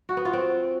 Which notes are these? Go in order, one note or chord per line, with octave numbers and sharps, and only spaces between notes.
F#4
B3
F4
C4